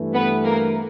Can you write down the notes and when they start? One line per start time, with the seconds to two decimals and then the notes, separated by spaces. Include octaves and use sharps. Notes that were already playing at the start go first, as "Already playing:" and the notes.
Already playing: G2 E3 A3
0.13 B3 B4
0.44 A#3 A#4